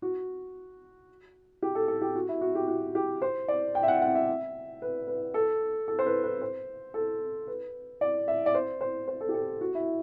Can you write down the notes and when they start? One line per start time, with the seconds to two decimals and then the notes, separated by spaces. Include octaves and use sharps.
0.02 F#4
1.62 G4
1.75 A4
1.88 A4
2.02 G4
2.15 F#4
2.29 E4
2.41 F#4
2.55 G4
2.68 F#4
2.95 G4
3.22 C5
3.48 D5
3.75 G5
3.83 E5
3.88 F#5
3.97 E5
4.02 F#5
4.15 E5
4.82 B4
5.08 B4
5.34 A4
5.88 A4
5.99 C5
6.06 B4
6.24 B4
6.42 C5
6.94 A4
7.47 B4
8.01 D5
8.28 E5
8.46 D5
8.55 C5
8.81 C5
9.08 C5
9.21 A4
9.29 G4
9.34 A4
9.61 F#4
9.75 E4